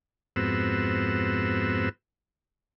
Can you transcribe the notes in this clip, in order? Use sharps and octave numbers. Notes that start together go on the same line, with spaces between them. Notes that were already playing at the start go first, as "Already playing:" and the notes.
F2 G#2 B3 C4 F#4 E6